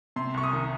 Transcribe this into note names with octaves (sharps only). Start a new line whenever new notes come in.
C3 C6
C2 C#6
D#6
D#3